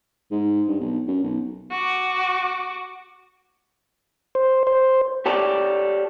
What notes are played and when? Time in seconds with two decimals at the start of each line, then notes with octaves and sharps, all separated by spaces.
0.31 G#2
0.68 G2
0.80 B1
1.08 F#2
1.23 B1
1.71 F#4 D6
4.35 C5
4.67 C5
5.26 G4 A4 C#5 D5